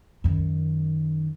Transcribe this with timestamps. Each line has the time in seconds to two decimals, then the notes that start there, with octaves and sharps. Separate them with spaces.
0.24 F#2 D#3